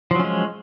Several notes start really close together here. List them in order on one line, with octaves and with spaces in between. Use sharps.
F3 F#3 C#4 G#3